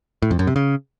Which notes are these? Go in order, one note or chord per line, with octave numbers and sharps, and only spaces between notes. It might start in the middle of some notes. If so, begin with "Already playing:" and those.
A2
F2
F#2
C3
C#3